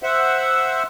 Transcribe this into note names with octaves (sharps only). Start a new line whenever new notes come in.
C5 E5 F#5